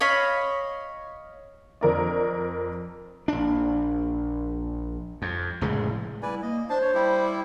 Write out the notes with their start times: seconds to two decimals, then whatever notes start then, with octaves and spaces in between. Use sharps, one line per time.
0.01 C#5 D#5 F5 B5
1.81 F2 A#4 D5
3.28 A#1 D4
5.22 F2
5.61 F1 A2 C#3 G#3
6.23 G3 B3 E4 B4 D5 G#5
6.42 A#3 D#5
6.70 D4 C5 A5
6.82 C#5
6.94 G3 E4 G4